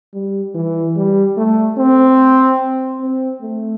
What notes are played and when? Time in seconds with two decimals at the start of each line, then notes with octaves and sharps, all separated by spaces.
0.14 G3
0.55 E3
0.96 G3
1.37 A3
1.78 C4
3.01 C4
3.42 A3